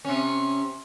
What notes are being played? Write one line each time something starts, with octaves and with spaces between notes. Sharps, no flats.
C3 C#4